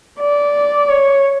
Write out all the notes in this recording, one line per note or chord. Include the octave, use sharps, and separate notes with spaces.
D5
C#5